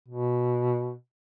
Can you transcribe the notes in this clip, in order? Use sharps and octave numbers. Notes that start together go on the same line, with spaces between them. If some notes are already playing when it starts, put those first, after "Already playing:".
B2